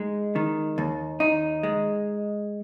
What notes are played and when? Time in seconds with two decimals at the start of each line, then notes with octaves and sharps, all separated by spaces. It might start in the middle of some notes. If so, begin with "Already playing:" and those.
Already playing: G#3 D#4
0.36 D#3
0.78 D#2
1.20 D#4
1.63 G#3